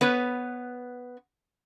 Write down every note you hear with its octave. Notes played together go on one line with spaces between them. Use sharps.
B3 B4 C#5